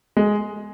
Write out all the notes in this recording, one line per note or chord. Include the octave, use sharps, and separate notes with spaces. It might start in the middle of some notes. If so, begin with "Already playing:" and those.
G#3